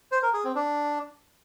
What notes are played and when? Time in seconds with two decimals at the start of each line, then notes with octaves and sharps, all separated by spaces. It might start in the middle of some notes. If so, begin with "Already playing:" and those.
0.12 C5
0.23 A#4
0.34 G#4
0.44 C4
0.55 D4